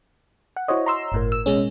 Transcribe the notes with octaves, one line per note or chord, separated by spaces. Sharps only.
F#5
E4 F#4 C5 C#5 D#5
A#5 C6 E6
G1 A2 A#4
E6
B2 G#3 C#4